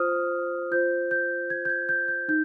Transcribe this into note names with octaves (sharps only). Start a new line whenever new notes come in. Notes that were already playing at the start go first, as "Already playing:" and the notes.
Already playing: F4 C5 D#6 F6
F4 C5 G6
G6
G#6
G6
G#6
G6
G6
D#4 G6